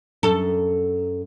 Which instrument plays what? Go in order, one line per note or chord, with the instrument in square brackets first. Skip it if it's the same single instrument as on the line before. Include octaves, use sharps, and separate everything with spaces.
[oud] F#2 A4